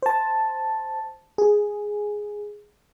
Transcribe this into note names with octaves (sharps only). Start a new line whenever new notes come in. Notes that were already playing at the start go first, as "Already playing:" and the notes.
C5 A5
G#4